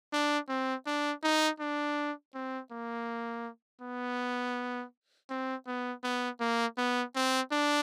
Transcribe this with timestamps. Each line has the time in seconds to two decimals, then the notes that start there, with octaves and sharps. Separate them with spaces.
0.13 D4
0.49 C4
0.86 D4
1.23 D#4
1.60 D4
2.34 C4
2.71 A#3
3.81 B3
5.30 C4
5.67 B3
6.04 B3
6.40 A#3
6.77 B3
7.15 C4
7.52 D4